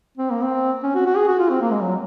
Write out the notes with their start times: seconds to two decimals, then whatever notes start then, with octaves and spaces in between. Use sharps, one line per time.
0.18 C4
0.31 A#3
0.44 C4
0.83 C#4
0.95 F#4
1.06 F#4
1.17 G#4
1.28 F#4
1.39 F4
1.49 C4
1.61 A#3
1.71 G#3
1.82 F#3